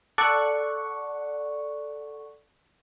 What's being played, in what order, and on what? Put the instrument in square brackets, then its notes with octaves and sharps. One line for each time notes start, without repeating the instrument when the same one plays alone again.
[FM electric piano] A4 D5 F#5 C#6